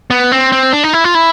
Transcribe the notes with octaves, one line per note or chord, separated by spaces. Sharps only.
B3
C4
C4
D4
D#4
E4
F4
E4